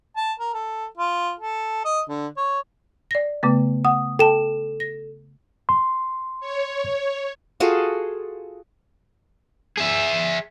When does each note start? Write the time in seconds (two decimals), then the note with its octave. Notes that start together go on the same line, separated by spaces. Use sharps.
0.16 A5
0.40 A#4
0.54 A4
0.98 F4
1.40 A4
1.85 D#5
2.09 D3
2.37 C#5
3.11 D5 A#6
3.43 C#3 A3 B3
3.85 F#5 D#6
4.19 A4 G5 A5 E7
4.80 A#6
5.69 C6
6.40 C#5
7.60 F4 F#4 G#4 A4
9.78 G#4 E5